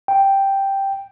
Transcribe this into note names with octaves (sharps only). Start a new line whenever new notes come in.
G5